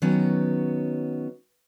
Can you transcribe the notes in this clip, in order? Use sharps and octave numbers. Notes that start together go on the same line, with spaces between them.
D#3 F#3 B3 C#4